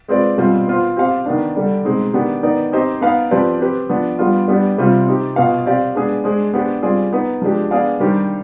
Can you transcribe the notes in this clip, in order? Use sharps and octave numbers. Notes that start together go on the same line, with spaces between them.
G#3 C4 F4 B4 D5
B2 G3 C4 F4 C5
B3 F4 C5
C4 G4 C5 F5
D#3 B3 D4
D3 G3 D4
B2 G#3 C4 D#4
D#3 B3 D4 G4
D#3 B3 D#4 B4 D5
C4 D#4 G4 C5 D#5
B3 D#4 B4 F5
F3 C4 G4 B4 D5
C4 G4 B4
F3 B3 D4
G3 B3 D4 F4
G3 B3 D4 G4
C3 G3 C4 F4
C4 D#4 G4
B2 B3 F4 B4 F5
C4 G4 D5 F5
G#3 B3 D4 G#4
G#3 D4 G#4 C5
B3 D4 G4 C5
G3 C4 F4 G#4 D5
B3 D#4 B4
F3 G#3 D4 G4
B3 D4 G#4 D5 F5
D#3 G3 D4 G4 C5